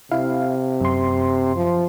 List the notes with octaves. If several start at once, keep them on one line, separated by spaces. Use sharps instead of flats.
C3 E4 F5
F#2 C6
F3